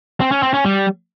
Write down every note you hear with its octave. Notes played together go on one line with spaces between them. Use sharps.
C4
C#4
C4
C#4
G3